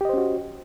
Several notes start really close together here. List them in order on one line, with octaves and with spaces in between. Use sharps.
G4 D#5 C5 C#4 F#4